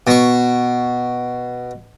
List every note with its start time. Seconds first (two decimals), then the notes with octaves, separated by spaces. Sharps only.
0.07 B2 C#6